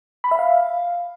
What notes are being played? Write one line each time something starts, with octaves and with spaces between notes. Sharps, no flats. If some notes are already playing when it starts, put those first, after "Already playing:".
B5
E5
F5